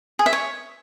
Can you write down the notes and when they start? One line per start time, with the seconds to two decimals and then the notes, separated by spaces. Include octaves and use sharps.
0.19 G#4
0.26 E5
0.33 C#5